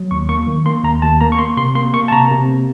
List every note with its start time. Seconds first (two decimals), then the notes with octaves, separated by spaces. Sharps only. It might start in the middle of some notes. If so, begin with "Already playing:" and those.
Already playing: F#3
0.11 D#2 C#6
0.29 A#3 C#6
0.47 D#3
0.66 A#3 C6
0.84 D#2 A#5
1.02 D#2 A5
1.21 A#3 A#5
1.32 C#6
1.38 A#3 C6
1.57 C3 C6
1.75 A#3 C6
1.93 A#3 C#6
2.08 A5
2.12 C3 A#5
2.31 C3
2.49 A#3